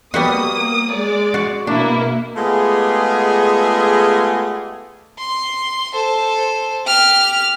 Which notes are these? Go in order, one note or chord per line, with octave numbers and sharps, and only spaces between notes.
G3 A#3 B3 F#4 D#6
G#3 D5
F#4
B2 A#3 D4 E4
G#3 A3 B3 F4 G4 G#4
C6
A4 C5
G4 F6